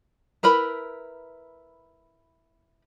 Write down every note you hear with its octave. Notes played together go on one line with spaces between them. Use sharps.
E4 A#4 B4 B5